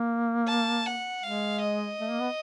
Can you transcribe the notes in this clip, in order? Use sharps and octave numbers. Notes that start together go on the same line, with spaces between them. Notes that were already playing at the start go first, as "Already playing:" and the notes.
Already playing: A#3
A5
F#5
G#3 F5
D#5
A3
A#3
B3